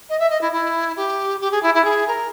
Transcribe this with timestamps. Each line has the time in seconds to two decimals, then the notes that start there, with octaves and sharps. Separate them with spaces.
0.09 D#5
0.19 E5
0.30 D#5
0.41 E4
0.52 E4
0.96 G4
1.41 G4
1.51 G#4
1.63 E4
1.74 E4
1.84 G#4
2.07 A#4